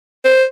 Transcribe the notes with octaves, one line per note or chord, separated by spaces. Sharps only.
C5